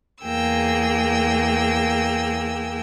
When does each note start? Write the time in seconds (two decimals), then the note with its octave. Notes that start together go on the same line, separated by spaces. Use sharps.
0.23 E2 A#3 G#4 G5 E6